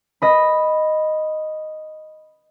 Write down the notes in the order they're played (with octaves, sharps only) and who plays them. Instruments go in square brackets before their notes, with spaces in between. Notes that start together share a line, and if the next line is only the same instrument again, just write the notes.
[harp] D#5 B5